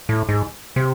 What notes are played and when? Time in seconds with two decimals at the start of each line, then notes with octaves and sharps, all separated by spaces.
0.09 A2
0.29 G#2
0.76 C3